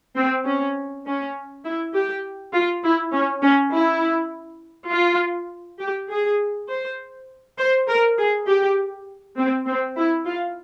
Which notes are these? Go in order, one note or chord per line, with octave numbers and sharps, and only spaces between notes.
C4
C#4
C#4
E4
G4
F4
E4
C#4
C#4
E4
F4
G4
G#4
C5
C5
A#4
G#4
G4
C4
C4
E4
F4